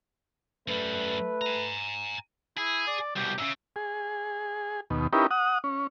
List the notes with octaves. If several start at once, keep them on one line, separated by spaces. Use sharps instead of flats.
F#2 G3 A3 B4
G#5 A#5
E4 G#4
D5
C2 B2 G4
A#2 C#3 E5
G#4
D#2 B2
C#4 D#4 E4 G4 A#4 B4
F#5 D#6
C#4